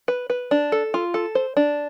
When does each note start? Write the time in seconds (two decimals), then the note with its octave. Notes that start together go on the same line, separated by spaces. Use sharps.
0.08 B4
0.30 B4
0.51 D4
0.72 A4
0.94 F4
1.14 A4
1.35 C5
1.57 D4